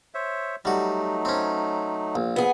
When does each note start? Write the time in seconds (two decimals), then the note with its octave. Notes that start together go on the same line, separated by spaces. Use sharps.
0.14 C5 C#5 E5
0.65 F#3 G3 A3 D#4 F#4
1.25 C4 C#4
2.15 A#1
2.36 B3 G#4